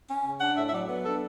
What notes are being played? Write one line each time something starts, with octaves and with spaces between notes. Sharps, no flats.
C#4
C#3
D4 F#5
A2 E5
E5
F#3 D5
B3
D4 A4